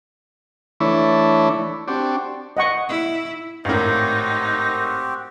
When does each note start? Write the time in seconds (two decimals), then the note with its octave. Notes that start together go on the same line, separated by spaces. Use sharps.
0.80 E3 A3 D4 E4 C#5
1.88 C4 D4 F#4 G4
2.57 D#5 F#5 C#6
2.89 E4
3.65 G#1 A2 C4 D#4 F#4 G4 A#4 F5